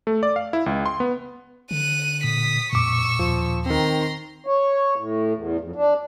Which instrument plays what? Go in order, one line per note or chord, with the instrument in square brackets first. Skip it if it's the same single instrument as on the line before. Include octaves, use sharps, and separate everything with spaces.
[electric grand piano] A3
D5
F5
E4
C#2
C6
B3
[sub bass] D3 [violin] F#6 D#7
[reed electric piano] A#2 [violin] D#6 B6
[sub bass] F2 [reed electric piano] A#2 D6 [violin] C#6 E6
[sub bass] D#2 [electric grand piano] F3
[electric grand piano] D#3 C4 [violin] A#5 C6
[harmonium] C#5
A2
E2
F2
D4